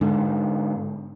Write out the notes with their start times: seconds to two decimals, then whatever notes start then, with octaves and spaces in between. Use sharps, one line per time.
0.01 G#2 D3